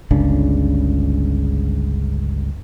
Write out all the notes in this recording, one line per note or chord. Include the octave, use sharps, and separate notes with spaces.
G1 C#2 C#3 D4